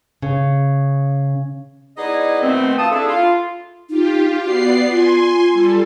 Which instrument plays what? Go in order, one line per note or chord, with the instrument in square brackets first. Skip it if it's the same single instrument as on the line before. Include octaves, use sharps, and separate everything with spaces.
[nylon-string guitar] C#3
[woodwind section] B3 D#4 E4 G#4 D5 D#5
B2 D#3 A3 B3 C4
F4 A5 D#6
D4 E4 G#4 A4
F4
[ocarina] D#4 [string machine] F4 G4
[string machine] B3 D5 C7 [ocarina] F#4
[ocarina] F4 [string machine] G#5 C6
[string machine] G3 A4